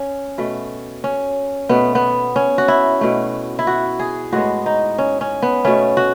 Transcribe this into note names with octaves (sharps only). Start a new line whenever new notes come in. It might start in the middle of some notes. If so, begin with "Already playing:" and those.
Already playing: C#4
B2 A3
C#4
B2 A3 B3
B3
C#4
F#4
E4
B2 A3
E4
F#4
G#4
A2 G#3 B3 F#4
D#4
C#4
C#4
B3
B2 A3 C#4
F#4